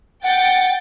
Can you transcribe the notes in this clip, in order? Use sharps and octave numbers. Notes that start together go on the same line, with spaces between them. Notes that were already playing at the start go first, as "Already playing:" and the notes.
F#5 G5 A6